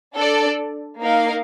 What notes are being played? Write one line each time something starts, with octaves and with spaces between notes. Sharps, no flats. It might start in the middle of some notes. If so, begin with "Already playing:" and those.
D4 A4 D5
A#3 D#4 A#4 F5